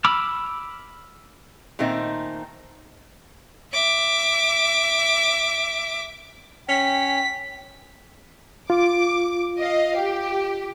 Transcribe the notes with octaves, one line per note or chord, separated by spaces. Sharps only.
B5 D6 E6 F6
A#2 D#3 A3 C4 D#4
E5 D6
C#4 G5 B6
F4 D6
D#5 F5
G4